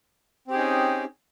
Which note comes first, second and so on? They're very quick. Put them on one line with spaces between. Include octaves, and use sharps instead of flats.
C4 G4 G#4 D#4 C#4